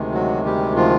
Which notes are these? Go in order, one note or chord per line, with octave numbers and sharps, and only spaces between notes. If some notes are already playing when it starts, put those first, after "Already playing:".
Already playing: D2 C3 D#3 G#3
F#3 F#4
G3 G4
F3 F4